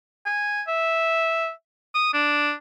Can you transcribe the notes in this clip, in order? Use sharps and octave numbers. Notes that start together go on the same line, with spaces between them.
G#5
E5
D#6
D4